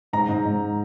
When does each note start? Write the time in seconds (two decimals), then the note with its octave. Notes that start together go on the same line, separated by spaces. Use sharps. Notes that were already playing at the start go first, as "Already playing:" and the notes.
0.13 G#2 A#5
0.29 G#2
0.45 G#2